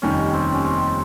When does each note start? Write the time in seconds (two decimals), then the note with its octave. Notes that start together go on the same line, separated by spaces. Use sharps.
0.02 F1 D#2 D#3 G3 C#4
0.33 C4
0.53 C#4
0.64 C4